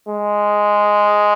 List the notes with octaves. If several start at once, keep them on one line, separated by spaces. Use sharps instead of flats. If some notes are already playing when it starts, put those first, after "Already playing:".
G#3